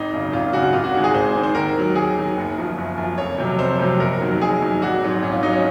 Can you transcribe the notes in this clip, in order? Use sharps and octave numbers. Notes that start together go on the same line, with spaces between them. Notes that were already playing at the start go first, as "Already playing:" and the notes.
Already playing: G#1 D#4
F#2 C#3
G#1 F4
F#2 C#3 F#4
F#4
G#1 F4
F#4
G#2 D#3 G#3 F#4
G#4
G#1 C5
G#2 D#3 G#3
C5
D#2 A#4
D#3 F#3
D#2 G#4
D#3 F#3
F#1
F#2 F3
F#1
F#2 F3
F1 C#5
F2 C3 F#3
F1 C5
F2 C3 F#3
F#1 A#4
F2 D#3 F#3
F#1 G#4
F2 D#3 F#3
G#1 F#4
G#2 F#3
G#1 C#4
F4
F#3 D#4
C#4